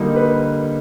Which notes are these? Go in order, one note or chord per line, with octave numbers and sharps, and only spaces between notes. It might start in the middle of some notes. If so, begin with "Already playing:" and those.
Already playing: D3 G3 A#3 D#4
B4